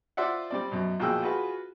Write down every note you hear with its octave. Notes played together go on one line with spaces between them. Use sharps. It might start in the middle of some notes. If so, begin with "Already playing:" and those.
F4 C5 D5 E5 F#5
G3 C4 D5
F#2 B2
A#1 B2 A#3 G#4 G5 E6
F4 F#4 G#4 B4